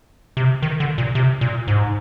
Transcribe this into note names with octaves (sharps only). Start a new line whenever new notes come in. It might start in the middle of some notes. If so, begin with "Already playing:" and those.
C3
D#3
D3
A#2
C3
A#2
G#2